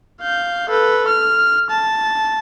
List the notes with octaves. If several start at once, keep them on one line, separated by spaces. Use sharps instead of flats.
F5 G6
A4 B4
F6
A5